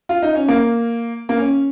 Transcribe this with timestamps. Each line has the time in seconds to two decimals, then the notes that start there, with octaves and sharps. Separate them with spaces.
0.09 F4
0.22 D#4
0.35 C#4
0.48 A#3
1.29 A#3
1.38 C#4